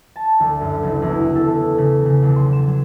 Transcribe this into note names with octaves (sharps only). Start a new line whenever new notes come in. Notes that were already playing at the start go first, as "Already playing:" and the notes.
A5
D2
F#2
F#1
E2
A4
C#3
C#3
B1
C6
E7
F#3